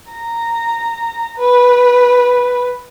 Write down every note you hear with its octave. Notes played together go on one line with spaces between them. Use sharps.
A#5
B4